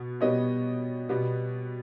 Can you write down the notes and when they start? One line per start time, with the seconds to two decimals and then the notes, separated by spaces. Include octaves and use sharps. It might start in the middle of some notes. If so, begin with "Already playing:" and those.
Already playing: B2 B3
0.21 B2 G3 B3 C#5 D#5
1.09 B2 G3 B3